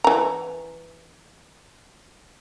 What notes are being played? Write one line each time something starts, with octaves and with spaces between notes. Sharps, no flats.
E3 A#5